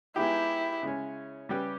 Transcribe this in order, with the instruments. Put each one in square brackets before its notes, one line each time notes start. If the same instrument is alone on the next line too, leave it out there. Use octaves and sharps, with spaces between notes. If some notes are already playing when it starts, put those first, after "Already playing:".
[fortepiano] G#3 B3 D#4 G4 [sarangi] E4
[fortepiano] C#3 G#3 C#4
C#3 G3 C#4 G4 B4